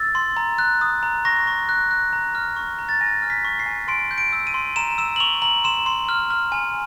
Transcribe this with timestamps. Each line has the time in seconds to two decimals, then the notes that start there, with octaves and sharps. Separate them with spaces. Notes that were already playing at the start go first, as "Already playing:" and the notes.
Already playing: E6 A6
0.15 C6
0.37 A#5
0.58 F#6
0.81 D#6
1.03 A#5
1.25 C#6 A#6
1.47 C#6
1.69 F#6
1.91 F#6
2.13 A#5
2.35 F6
2.56 C#6
2.79 A#5
2.89 A6
3.01 G#5 A#6
3.22 F6
3.30 B6
3.45 C#6
3.59 C7
3.66 G#5
3.88 C6 D7
4.11 G6
4.18 D7
4.33 E6
4.47 D#7
4.54 C6
4.76 A#5 E7
4.98 E6 E7
5.16 F#7
5.20 C#6 F7
5.42 A#5 F#7
5.64 C6 E7
5.86 C6
6.09 F6
6.30 F6
6.52 G#5